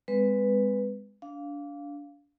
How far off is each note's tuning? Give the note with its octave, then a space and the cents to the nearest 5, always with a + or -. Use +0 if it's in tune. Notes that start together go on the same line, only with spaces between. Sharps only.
G#3 -25 C4 -35 B4 +0
D4 -25 F5 +0